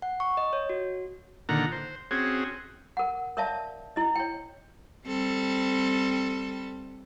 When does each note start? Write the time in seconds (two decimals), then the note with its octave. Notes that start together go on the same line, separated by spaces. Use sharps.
0.02 F#5
0.20 C#6
0.37 D#5
0.53 C#5
0.69 F#4
1.49 A#2 D3 D#3 F#5 A#5
1.72 C5
2.11 C4 C#4 F#4 G#4
2.97 A#4 F#5
3.37 A#4 C#5 D5 E5 F5 A5
3.96 E4 D#5
4.15 C#5 G5
5.07 G3 C4 A4